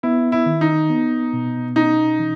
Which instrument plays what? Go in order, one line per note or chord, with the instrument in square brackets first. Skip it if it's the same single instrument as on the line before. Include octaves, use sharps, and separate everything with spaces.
[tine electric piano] B3 [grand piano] E4
[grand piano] E4
[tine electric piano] D#3
[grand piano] D#4
[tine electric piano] B3
B2
[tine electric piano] C#4 [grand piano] D#4
[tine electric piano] E3